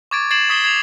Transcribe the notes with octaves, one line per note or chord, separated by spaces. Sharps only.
C#6 D6 G#6 A6 D7
G#6 A6 C7 D7 E7 F#7
C#6 D#6 B6 C7 F#7 G7
G#6 C7 E7 F7